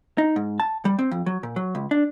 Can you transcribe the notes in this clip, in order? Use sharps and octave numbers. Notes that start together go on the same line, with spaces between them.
D#4
G#2
A5
G3
C4
F2
F#3
A#2
F#3
C#2
D4